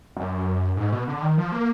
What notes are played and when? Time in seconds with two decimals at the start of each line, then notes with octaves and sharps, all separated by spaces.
0.17 F#2
0.77 G#2
0.92 B2
1.08 D3
1.22 D#3
1.38 F3
1.52 A#3